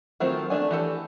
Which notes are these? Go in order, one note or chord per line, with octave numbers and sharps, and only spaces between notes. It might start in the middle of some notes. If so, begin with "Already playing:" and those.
D#3 F#3 A3 C4 F4
A3 A#3 D4 G#5
E3 G4 A4